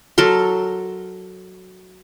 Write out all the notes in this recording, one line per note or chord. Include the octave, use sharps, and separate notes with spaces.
F#3 A4 A#4 C6